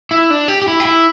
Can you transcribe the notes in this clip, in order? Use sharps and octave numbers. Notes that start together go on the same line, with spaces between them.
E4
D4
G4
G4
E4
G4
E4